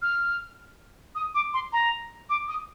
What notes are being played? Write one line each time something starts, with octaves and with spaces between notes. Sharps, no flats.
F6
D#6
D6
C6
A#5
D6
D#6